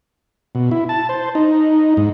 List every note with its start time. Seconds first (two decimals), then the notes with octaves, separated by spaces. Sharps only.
0.55 B2
0.71 E4
0.89 A5
1.09 C5
1.35 D#4
1.97 G#2